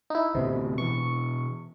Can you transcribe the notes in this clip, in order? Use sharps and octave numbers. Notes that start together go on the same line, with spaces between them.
D#4 E4
D2 A2 C3 B3
B2 E3 C#6